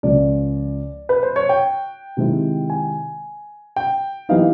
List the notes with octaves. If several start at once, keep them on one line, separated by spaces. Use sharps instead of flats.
C#2 C#3 F3 D5
B4
C5
C#5
G5
C3 D#3 G#3 C4 E4
G#5
G5
E3 G3 B3 D#4 F5